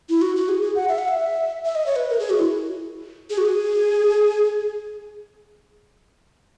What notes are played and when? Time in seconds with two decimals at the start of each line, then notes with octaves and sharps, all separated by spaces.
0.09 E4
0.22 F#4
0.36 F#4
0.49 G#4
0.62 G#4
0.76 F#5
0.89 E5
0.98 F#5
1.08 E5
1.65 E5
1.75 D#5
1.86 C#5
1.96 B4
2.10 A#4
2.20 G#4
2.30 F#4
2.40 E4
3.30 G#4
3.38 F#4
3.46 G#4